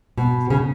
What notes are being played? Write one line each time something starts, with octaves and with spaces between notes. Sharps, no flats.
B2
C#3